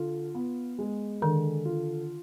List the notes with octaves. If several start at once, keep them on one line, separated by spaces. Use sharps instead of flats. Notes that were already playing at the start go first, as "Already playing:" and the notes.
Already playing: D3 F4
B3
G#3
D3 D#3
F4